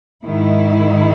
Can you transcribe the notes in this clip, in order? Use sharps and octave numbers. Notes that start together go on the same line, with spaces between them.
G#2 D#3 G#3 E4